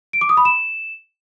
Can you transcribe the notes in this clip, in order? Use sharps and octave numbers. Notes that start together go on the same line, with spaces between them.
D7
D6
D#6
B5
E7